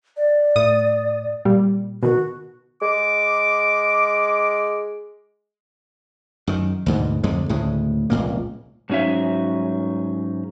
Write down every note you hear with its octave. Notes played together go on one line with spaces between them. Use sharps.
D5
A2 D#6
A#2 G3
B2 D#3 F#4
G#3 D6
F#2 D#3
D2 G#2 B2
F2 D3 G#3
D2 A2 C#3 G#3
F1 C#2 A#2 A#3
G#2 F#3 C#4 D#4 E5